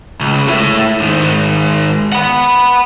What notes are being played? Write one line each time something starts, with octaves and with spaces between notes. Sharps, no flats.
C#2
A3 E4
G#2 D#3
F#5 B5